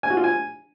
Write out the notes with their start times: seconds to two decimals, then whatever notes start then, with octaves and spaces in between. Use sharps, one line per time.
0.03 G#5
0.10 F#4
0.17 F4
0.24 G#5